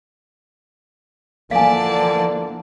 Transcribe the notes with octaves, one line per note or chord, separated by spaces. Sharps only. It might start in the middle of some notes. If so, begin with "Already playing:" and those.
D3 E3 F3 A#3 D5 F5 G#5 A5